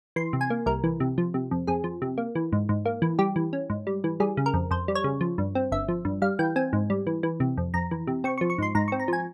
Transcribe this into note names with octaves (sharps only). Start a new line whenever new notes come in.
E3 C6
C3
G#5
A#3
C2 A#4
E3
C3
F3
C3
F2
F2 G#4
F3
C3
A#3
E3
G#2
G#2
A#3
E3
G3 G4
E3
C#4
G#2
G3
E3
G3 G#4
C#3
A#4
F2
F2 C5
G3
C#5
C#3
F3
G2
C4
G1 E5
F3
G2
G3 F5
E3 G5
C4 G#5
G#2
G3
E3
E3
C3
F2
F2 A#5
E3
C3
C4 C#6
C#6
F3
C#6
G#2 C6
G#2 A#5
C4 C#6
A#5
F3 G#5